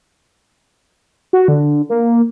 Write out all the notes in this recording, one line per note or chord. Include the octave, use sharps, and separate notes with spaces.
F#4
D3
A#3